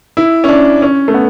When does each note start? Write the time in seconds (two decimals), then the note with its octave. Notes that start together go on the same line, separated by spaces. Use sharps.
0.17 E4
0.44 C#4
0.49 D4
0.82 C#4
1.08 A3
1.14 B3